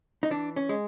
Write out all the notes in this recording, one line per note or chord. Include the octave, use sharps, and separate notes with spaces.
D#4
E3 D4
C#4
G#3